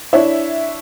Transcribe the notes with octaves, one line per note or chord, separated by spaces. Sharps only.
D4 E4 C#5 E5